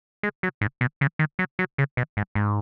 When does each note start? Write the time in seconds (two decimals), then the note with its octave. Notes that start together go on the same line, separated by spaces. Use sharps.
0.23 G#3
0.43 F#3
0.61 G#2
0.81 B2
1.01 C#3
1.19 D#3
1.39 F#3
1.59 F#3
1.78 C#3
1.97 B2
2.17 G#2
2.35 G#2